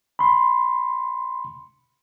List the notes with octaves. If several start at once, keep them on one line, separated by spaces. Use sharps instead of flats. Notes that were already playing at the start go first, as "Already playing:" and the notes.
B5 C6